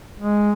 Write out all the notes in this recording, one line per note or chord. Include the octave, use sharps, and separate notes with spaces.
G#3